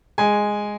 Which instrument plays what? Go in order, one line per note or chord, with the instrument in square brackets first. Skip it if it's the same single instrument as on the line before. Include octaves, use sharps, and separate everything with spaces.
[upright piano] G#3 G#5